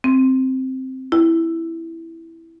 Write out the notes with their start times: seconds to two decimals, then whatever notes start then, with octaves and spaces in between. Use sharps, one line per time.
0.04 C4
1.12 E4